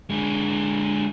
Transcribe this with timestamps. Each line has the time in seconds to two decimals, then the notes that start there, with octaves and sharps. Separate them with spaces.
0.10 D3 G#3